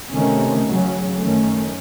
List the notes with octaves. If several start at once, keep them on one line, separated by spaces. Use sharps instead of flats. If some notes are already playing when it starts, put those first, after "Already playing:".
C3 D#3 A3 C#4
C#3 F#3 C#4
F#2 D#3 A3 C#4